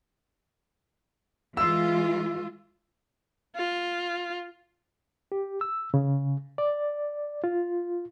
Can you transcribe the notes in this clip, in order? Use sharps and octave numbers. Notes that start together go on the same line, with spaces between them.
E3 G#3 F4 E6
F4
G4
E6
C#3
D5
F4